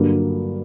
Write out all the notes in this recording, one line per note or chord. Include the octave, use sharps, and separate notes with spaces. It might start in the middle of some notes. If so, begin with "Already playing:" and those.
Already playing: G2 D3 F#3 A#3